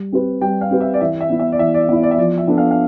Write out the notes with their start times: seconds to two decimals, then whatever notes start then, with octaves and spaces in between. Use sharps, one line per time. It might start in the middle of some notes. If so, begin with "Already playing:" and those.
Already playing: G3
0.12 C4 G4 B4
0.42 G3 G5
0.61 F5
0.71 C4 G4 B4
0.81 E5
0.94 D5
1.01 E3 E5
1.21 E5
1.30 B3 E4
1.40 E5
1.52 D5
1.59 E3 E5
1.74 D5
1.88 B3 E5
1.92 E4
2.03 D5
2.11 E5
2.18 F3 D5
2.38 E5
2.47 B3 D4 A4
2.58 F5
2.71 F5